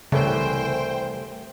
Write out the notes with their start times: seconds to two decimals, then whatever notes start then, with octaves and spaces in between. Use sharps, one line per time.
0.12 C2 C#3 E3 A3 C5 G5